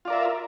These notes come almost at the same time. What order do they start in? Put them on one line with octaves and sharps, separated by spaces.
F4 D5 A#4 E5